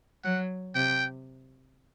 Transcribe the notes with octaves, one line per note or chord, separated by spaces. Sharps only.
F#3 F#5
C3 G5